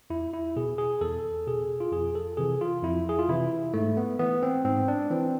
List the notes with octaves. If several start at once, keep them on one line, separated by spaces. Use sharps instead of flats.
E2 E4
E4
B2 G#4
G#4
E2 A4
B2 G#4
F4
F2 G#4
A4
C3 E3 G#4
F4
F2 E4
G#4
F4
C3 E3 E4
G#2 A3
B3
E3 B3
C4
G#2 C4
D4
E3 C4